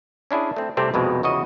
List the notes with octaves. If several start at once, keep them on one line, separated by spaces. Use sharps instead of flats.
C#4 D4 E4 G#4
A3 C4
C2 C3 A3 C4 G4
C2 F2 B2 G#3
E2 C#3 F#4 D#5